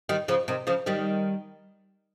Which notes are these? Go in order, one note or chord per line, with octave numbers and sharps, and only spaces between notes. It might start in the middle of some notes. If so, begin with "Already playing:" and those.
D#3 G3
C#3 F3
C3 D#3
C#3 F3
D#3 G3